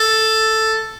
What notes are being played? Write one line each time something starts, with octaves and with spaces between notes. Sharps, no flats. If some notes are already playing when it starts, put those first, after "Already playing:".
Already playing: A4